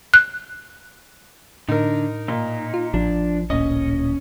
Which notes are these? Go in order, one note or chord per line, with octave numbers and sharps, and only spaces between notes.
F#6
A2 D3 D#4 A#4
A#2 D#4
F4
A1 F3 D4
D1 A#2 C#4 D#5